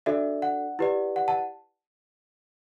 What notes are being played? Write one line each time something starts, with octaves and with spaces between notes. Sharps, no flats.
D4 F#4 A4 D5 E5
F#5
E4 G4 B4 D5
F#5
F#5 A5